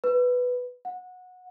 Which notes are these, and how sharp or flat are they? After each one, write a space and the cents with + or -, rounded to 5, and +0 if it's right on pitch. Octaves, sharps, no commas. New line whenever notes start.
B4 +5
F#5 -20